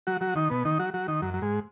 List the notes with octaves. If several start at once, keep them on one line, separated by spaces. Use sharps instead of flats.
F#3 F#4
F#3 F#4
D#3 D#4
B2 B3
D#3 D#4
F#3 F#4
F#3 F#4
D#3 D#4
F#2 F#3
F#3
G#2 G#3